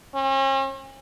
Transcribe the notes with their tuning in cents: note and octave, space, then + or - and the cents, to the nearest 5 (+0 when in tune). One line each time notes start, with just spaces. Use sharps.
C#4 -45